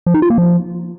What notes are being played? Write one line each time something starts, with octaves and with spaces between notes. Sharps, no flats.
F3
D#4
F4
A#3
F3